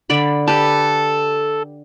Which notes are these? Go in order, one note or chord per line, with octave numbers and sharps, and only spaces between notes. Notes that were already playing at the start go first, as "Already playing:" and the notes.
D3 D5 B5
G4 A4 B4